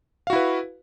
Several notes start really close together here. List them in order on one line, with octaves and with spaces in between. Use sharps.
F5 F#4 E4 B4